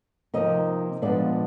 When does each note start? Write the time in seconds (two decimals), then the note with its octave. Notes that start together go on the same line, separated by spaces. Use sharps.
0.34 C3 F3 A#3 D#4 D#5
1.02 A#2 F3 G#3 B3 D4 D5